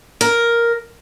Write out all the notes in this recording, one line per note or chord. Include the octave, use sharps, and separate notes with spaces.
A#4